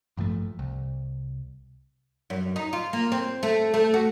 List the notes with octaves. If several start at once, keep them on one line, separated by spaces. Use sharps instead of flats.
A1 G2 F3 A3
C2
F#2
D#4
F4
A#3
C4
A3
A3
F#4